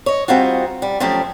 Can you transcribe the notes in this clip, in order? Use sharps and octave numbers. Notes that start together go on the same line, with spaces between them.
C#5 D#5
G3 C4 D#4 F4 F#4
G3
F3 F#3 A3 C#4 G4